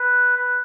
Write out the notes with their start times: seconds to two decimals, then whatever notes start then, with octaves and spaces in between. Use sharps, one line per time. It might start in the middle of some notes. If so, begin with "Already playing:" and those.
Already playing: B4
0.36 B4